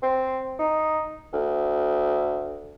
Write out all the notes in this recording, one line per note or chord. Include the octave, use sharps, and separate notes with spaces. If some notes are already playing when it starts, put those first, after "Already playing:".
C4
D#4
D2